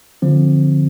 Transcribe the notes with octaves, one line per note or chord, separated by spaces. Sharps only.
D3 F3 C4